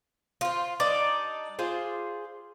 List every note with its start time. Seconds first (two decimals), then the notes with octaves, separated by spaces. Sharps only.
0.41 F4 C5
0.80 G3 D4 D#4 D5
1.59 F4 G#4 C5